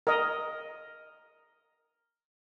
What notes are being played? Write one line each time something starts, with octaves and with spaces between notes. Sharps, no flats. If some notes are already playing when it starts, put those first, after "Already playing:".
A#4 D#5